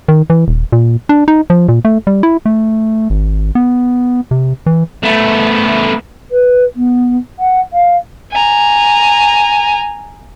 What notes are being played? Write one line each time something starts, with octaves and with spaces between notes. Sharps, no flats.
D#3
E3
D#1
A#2
D4
D#4
F3
A#2
A3
G3
E4
A3
G#1
B3
C3
E3
A3 B3
B4
B3
F#5
F5
G#5 A#5